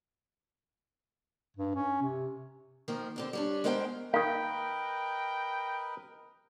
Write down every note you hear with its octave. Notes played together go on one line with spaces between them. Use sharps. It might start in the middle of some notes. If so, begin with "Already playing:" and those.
G2
C#4
C3
D#3 F3 A#3
D3 C4 D4
G3 C#4 D4
G#3 B3 A#4 C5 F#5 G5
D#3 A#3 A#4 B4 D#5 F5 G5